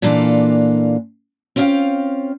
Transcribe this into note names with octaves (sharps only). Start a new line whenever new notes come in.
A#2 E3 A#3 D4 F4 A4
C4 C#4 F4 E5 F5 G5